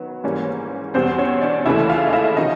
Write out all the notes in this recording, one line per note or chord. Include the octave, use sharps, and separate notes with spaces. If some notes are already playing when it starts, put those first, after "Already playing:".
Already playing: D#3 F#3 B3 B4
G#2 E3 G3 A#3 C#4
E2 B2 G3 C4 C5
C#4 C#5
D4 D5
D#2 C#3 E3 A3 E4 E5
F4 F5
D#5
E4 E5
C3 D#3 F#3 D#4 D#5